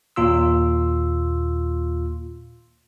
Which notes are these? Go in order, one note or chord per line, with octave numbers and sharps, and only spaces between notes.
D#2 A#2 F4 C6 E6